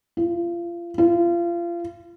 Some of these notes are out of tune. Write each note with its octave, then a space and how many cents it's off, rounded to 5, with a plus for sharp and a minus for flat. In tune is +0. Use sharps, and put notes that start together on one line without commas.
F4 -30
F4 -30